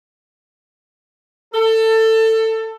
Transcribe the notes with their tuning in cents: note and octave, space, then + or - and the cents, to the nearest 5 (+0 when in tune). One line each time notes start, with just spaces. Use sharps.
A4 +20